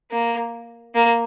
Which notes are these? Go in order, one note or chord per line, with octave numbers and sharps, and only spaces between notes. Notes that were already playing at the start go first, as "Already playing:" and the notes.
A#3
A#3